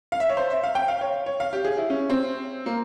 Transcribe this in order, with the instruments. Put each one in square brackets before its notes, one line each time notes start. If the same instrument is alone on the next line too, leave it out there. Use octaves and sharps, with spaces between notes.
[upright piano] F5
E5
C#5
C5
E5
F5
G5
F5
C#5
C#5
F5
G4
G#4
E4
C#4
C4
A#3